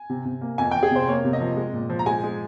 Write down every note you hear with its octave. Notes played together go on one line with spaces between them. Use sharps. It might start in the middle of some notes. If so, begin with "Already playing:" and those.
Already playing: G#5
C3
C3
A#3
F2 G#5
F2 G5
G#4
C3 C5
A#3 C#5
C3
D#5
F3
G#3
A#2
F3
A#5
G#3 G#5
G#3